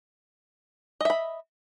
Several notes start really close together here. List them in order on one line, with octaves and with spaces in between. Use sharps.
D#5 E5 B5